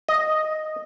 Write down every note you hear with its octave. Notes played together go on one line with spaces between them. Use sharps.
D#5